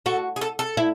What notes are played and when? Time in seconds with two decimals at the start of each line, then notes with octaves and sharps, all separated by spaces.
0.06 F#4 A4
0.36 G#4
0.41 A4
0.59 A4
0.77 E4